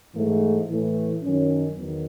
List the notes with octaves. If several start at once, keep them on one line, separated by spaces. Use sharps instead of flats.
G#2 E3 A3
A2 E3 A3
F#2 D#3 F#3 C#4
E2 D#3 F#3 B3